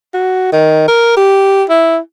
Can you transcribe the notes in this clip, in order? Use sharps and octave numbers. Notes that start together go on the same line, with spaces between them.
F#4
D#3
A#4
G4
E4